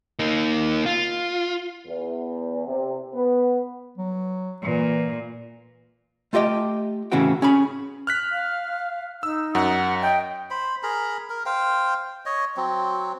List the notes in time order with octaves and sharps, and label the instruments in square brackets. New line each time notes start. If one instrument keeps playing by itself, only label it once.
[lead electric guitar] A#3 D#4
F4
[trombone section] E2
C3
B3
[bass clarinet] F#3
[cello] A#2 [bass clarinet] E3
[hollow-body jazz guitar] A3 F4 G4 D#5 G5
A2 C#3 E3 C#4 F#4 G5
C#4 G#4 B5
[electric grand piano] F6 F#6 B6
[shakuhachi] F5
[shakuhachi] D#4 [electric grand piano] E6
[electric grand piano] F#2 [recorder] F#5
[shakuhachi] D#5 [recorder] G5
[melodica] C5 B5
G#4 A#4 A#5 B5
A#4
C5 F5 G5
C#5 D#5
F#3 C4